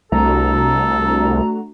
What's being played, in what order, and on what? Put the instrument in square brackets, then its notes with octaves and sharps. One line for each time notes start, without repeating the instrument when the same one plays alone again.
[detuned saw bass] C2 [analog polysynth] A3 D4 F#4 [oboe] A4 [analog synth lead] A#5